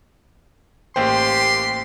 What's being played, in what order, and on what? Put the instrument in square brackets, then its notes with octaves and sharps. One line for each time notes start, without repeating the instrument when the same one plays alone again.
[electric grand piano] A1 A#3 C5 [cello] G4 [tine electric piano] G5 [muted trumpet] C6